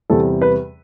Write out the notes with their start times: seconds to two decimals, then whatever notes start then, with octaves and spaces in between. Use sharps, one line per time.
0.10 E2 C3 G3 A4
0.42 B4